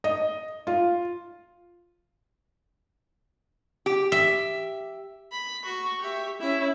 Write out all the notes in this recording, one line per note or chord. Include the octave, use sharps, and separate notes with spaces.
D#5
F4
G4
E5
B5
F#4 C#6
G4 E5
C#4 E4 E5